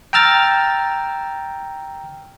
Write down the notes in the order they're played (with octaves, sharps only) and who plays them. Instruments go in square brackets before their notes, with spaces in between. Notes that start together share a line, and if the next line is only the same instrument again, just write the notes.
[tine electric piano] G5 A#5 E6 F6 A6